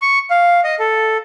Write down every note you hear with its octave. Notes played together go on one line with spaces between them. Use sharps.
C#6
F5
D#5
A4